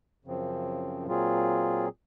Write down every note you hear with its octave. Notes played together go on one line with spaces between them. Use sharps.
F#2 C#3 F3 C4
A#2 F#3 C4 F4 G#4